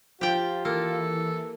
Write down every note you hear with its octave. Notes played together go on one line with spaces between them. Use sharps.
F3 F4 G4 G5
E3 A#3 A4